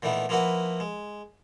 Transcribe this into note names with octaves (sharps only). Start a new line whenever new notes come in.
A#2 D#3 E3 A3 B3
F3 A#3 E4 F#4 B4 F#5
G#3